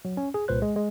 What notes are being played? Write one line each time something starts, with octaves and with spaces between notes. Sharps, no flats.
F#3
C#4
G#4
C2 A#2 B4 C5 F#6
G#3
G#3